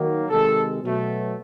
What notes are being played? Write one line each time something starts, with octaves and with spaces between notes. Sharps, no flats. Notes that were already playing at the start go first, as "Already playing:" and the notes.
Already playing: D#3 F#3 A#3
C3 D#3 G#3 A4
B2 F#3 A3